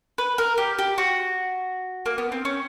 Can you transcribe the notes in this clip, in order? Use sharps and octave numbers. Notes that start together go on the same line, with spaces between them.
B4
A#4
G4
G4
F#4
A#3
B3
C4
C#4